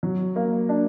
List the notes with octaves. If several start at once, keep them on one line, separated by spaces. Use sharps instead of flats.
F#3
A#3
D4